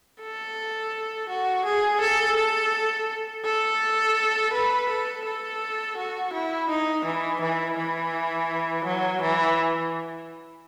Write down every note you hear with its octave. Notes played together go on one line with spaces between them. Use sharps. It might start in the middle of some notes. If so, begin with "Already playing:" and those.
A4
F#4
G#4
A4
A4
A4
B4
A4
A4
F#4
E4
D#4
E3
E3
E3
F#3
E3